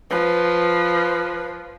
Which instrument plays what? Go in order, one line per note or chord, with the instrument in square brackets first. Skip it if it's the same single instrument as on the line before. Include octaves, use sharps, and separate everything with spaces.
[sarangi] F3 [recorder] B4